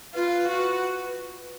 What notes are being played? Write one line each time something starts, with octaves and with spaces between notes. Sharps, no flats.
F4 B4
F#4